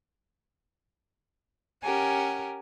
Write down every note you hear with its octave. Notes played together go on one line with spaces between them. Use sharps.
C#4 G4 A#4 F#5 G#5